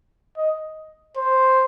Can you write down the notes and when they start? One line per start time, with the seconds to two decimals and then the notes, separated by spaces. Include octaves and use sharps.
0.37 D#5
1.17 C5